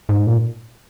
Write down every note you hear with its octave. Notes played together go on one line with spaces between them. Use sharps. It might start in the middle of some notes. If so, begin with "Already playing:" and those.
G#2
A#2